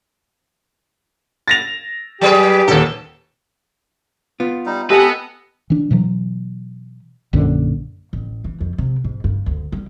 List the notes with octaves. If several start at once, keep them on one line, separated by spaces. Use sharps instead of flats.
A6 A#6 F7
F#3 G4 G#4 B4
D#1 D#2 A4
B3 F4
G3 D#4
G4 A4 B4 D#5 F#5 G#5
E3 D4
B2 E3 F#3
A#1 F#2 D3
A1
E3
F2
C3
G#2
G2
D2
G3